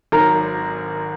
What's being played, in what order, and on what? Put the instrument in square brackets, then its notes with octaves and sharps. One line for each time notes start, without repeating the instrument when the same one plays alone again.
[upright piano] G#1 G#2 F#3 [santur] A#4